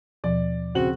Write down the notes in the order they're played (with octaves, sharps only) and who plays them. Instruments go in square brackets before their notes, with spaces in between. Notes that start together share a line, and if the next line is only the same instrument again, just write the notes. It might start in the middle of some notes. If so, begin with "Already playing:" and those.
[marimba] D#2 B2 F3 [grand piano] D5
[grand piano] C#3 C4 F#7 [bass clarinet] F#4